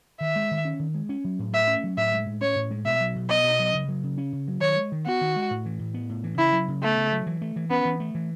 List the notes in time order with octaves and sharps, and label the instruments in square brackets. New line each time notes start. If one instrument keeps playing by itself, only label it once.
[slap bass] D#3 [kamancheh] E5
[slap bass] G#3
D#3
C#4
D#3
G#3
C#4
F#3
A2
[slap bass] A3 [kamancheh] E5
[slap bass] C#4
F#3
[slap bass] A2 [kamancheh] E5
[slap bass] G#3
A2
[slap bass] C#4 [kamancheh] C#5
[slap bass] A2
G#3
[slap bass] B2 [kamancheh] E5
[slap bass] F#3
B2
[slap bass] B3 [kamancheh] D#5
[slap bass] B2
F#3
C#3
F#3
C#3
C#4
C#3
F#3
[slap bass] D#3 [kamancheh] C#5
[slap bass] G#3
D#3
[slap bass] B3 [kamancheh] F#4
[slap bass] D#3
G#3
A2
E3
A2
B3
A2
E3
[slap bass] C#3 [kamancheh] E4
[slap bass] F#3
C#3
[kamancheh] A3 [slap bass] B3
[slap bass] C#3
F#3
E3
A3
E3
[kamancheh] B3 [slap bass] C#4
[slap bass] E3
A3
E3